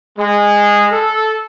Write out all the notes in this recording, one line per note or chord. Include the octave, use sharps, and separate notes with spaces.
G#3
A4